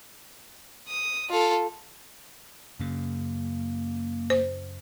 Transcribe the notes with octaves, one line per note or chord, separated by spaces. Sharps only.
D#6
F4 A4
F#2 C#3 A#3
C5